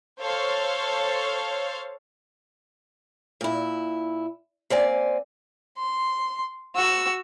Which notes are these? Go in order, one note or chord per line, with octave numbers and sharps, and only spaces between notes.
A4 C5 C#5 F5
A#2 E4
A#3 C4 D5 G#5
C6
F#4 E6